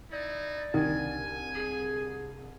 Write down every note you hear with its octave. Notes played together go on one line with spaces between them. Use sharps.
D#4 E4 D5
C2 D3 D#3 G#5
G#4